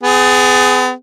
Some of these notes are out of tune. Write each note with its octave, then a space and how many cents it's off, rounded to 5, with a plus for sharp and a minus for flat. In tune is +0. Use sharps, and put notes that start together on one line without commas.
B3 +40 G#4 +0